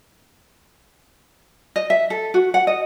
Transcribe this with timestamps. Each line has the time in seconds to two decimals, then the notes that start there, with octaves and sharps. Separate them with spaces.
1.76 D#5
1.90 E5
2.10 A4
2.34 F#4
2.54 F#5
2.67 D#5